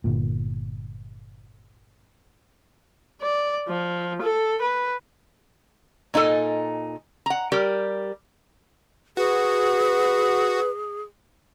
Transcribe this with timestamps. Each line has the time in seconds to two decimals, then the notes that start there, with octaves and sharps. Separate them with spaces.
0.04 G1 A#2
3.22 D5
3.68 F3
4.21 A4
4.61 B4
6.14 A#2 D#4 F4 A4 G#5
7.26 F#5 A#5
7.52 G3 G4 A#4
9.17 F#4 G#4 B4